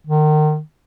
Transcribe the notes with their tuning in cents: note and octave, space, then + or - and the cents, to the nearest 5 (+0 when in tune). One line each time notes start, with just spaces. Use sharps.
D#3 -30